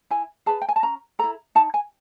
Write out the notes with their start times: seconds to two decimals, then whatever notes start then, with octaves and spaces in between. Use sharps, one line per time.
0.11 E4 G#5
0.46 G#4 B4 A5
0.62 G5
0.69 G#5
0.76 A5
0.83 C#4 A#5
1.19 E4 A4 A#5
1.55 D#4 A5
1.74 G#5